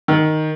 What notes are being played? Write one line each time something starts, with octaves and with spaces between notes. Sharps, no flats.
D#3